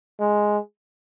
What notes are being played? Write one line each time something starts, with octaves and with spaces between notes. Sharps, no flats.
G#3